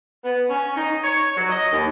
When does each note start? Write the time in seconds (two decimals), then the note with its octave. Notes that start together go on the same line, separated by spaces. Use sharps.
0.24 B3
0.50 C#4
0.75 D#4
1.03 C#5
1.37 F#3
1.50 D#5
1.71 D#2